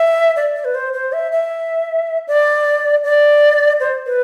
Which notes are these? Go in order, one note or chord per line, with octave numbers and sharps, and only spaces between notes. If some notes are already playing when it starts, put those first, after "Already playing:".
Already playing: E5
D5
D5
B4
C5
C5
E5
E5
D5
D5
C5
B4